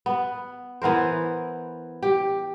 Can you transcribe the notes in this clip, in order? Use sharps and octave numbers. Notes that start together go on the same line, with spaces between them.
B3
E3 B3 A#4 C5
G4